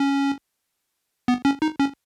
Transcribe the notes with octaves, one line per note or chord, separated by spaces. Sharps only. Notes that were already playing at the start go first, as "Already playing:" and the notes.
Already playing: C#4
B3
C#4
D#4
C#4